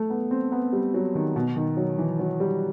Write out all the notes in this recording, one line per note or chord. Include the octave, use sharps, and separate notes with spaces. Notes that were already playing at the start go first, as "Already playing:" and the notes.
Already playing: A3
B3
C4
B3
G3
F#3
D#3
B2
D#3
F#3
E3
F#3
G3